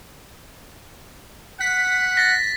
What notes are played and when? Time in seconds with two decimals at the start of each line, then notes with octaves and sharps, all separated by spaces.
1.61 F#5 B6
2.17 A6 A#6